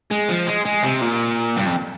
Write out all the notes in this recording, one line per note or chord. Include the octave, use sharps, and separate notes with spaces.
G#3
F3
G#3
G#3
C3
A#2
G2
F2